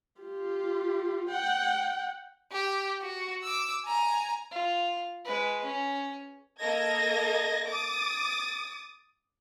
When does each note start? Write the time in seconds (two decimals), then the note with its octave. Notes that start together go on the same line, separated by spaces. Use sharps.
0.21 F4 G4
1.30 F#5 G5
2.52 G4
3.02 F#4
3.44 D6 E6
3.85 G#5 A#5
4.51 F4
5.25 G#3 B4
5.65 C#4
6.59 A#3 A4 A#4 D#5 G#6 A#6
7.68 D6 D#6 A6